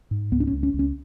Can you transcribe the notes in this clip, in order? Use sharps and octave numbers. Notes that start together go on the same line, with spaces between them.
G#2
C#2 B3
D4
C#4
C#2
C#4
C#2
C#4